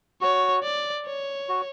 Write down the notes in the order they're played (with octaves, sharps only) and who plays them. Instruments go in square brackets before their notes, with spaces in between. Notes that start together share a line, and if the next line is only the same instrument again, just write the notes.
[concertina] F#4 [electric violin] C#5
[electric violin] D5
C#5
[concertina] F#4